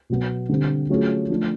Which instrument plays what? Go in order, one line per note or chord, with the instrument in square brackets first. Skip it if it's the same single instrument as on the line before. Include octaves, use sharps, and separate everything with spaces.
[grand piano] B2 F#3 B3
D3 G3 C4
F#3 A3 C#4 F4 G#4
F3 A3 D4